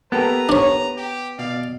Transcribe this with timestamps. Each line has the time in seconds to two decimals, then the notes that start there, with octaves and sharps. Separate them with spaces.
0.12 A#3 B3 G4 A4 B4 A#5
0.49 D4 C#5
0.97 G4
1.39 B2 D5 F5